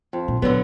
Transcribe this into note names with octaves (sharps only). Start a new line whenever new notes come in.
F2
A#2
B2 D3 F#3 B3